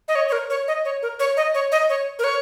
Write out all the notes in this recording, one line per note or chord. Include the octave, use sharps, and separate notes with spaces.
D#5
C#5
C#5
A#4
C#5
D#5
C#5
A#4
C#5
D#5
C#5
D#5
C#5
A#4
C#5